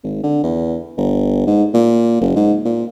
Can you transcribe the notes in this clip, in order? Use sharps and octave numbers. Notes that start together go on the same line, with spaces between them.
G#1
D3
E2
G1
G#2
A#2
F#1
G#2
A#2